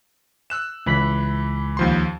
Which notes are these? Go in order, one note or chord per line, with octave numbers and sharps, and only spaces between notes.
E6 F#6 E7
C#2 E3 B5 B6
D#2 F3 C6